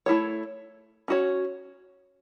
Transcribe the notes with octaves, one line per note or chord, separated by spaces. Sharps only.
A3 E4 A4 C#5
C#4 F#4 C#5